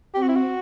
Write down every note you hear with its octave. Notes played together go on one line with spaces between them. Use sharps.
C4 G4
F#4
E4
F#4